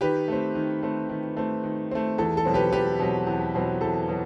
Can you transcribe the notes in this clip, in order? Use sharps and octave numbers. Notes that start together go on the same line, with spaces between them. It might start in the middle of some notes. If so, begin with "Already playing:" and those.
D#3 G4 B4
A3 C4
D#3
A3 C4
D#3
A3 C4
D#3
A3 C4
E2 A4
A4
B2 F#3 C4
G4 B4
E2 G4 B4
B2 F#3 C4
E2
B2 F#3 C4
E2 A4
B2 F#3